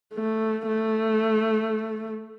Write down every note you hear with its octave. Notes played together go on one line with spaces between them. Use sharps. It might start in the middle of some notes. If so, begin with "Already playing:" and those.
A3
A3